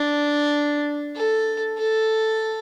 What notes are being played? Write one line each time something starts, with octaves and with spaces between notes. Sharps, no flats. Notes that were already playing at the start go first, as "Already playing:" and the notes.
Already playing: D4
A4
A4